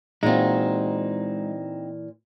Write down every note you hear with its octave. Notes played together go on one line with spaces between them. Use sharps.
A#2 E3 G#3 C4 D#4 F4 F#4